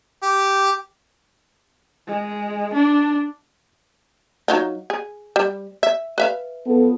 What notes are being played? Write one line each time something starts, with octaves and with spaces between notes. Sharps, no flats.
G4
G#3
D4
F#3 D#4 F4
G#4
G3
E5
B4 E5 F5
F3 B3 A4